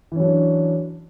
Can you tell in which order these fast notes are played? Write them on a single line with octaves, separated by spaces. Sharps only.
E3 C#4 F#3 D4